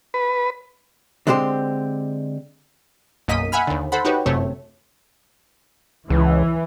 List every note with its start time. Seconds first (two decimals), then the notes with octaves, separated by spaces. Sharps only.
0.14 B4
1.27 D3 G#3 C4 G4 C5
3.28 B1 F#2 A#3 D#5 B6 D#7
3.52 E5 F#5 G#5 B5 F6
3.67 D#2 D3
3.92 A4 C5 F#5 B5
4.05 D#4 F#4 G4 B4 C#5
4.26 G1 F#2 C3 A3 C#5
6.10 C#2 E3